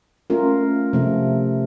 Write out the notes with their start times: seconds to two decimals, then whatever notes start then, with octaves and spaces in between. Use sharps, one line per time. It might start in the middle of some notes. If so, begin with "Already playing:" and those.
0.30 A3 C#4 F4 A#4
0.93 C3 F3 A3